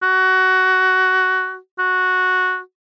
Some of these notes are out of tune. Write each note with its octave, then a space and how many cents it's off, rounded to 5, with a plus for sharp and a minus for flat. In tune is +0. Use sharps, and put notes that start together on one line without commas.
F#4 +15
F#4 -5